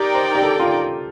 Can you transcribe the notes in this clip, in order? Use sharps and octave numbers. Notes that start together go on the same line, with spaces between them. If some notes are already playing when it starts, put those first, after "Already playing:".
Already playing: D#4 G4 A#4 D5 G5
C5
G4
A4
F4